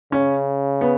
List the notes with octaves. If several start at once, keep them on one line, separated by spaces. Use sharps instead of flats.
C#3 C#4
B3